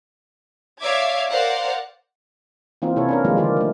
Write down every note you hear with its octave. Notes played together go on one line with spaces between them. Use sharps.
C#5 D5 E5 F5 D6 G#6
A#4 C5 D5 F5 F#5
E3 A#3 C4 D#4 F4
C3 E4 A4 C#5
C#4 D4 A#4
D#3 F3 G3 G#3 A#3 F4
D3 D#3 F4 G4 D5
A3 F4